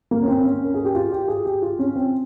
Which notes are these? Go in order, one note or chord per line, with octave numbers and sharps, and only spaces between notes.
A#3
C#4
C4
C#4
A#4
G#4
G4
F4
G4
G#4
G4
F4
C#4
C4